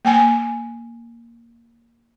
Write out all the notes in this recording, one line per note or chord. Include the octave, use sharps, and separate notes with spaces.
A#3 G5 G#5